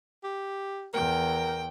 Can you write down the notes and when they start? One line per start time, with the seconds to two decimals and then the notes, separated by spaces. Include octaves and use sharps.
0.24 G4
0.94 E2 A#4 G5